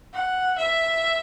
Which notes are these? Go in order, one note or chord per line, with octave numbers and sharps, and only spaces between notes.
F#5
E5